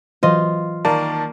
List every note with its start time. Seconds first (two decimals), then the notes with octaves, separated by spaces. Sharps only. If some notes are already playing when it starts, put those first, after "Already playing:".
0.23 E3 F#3 F4 C5 D#5
0.85 D#3 A#3 D5 A5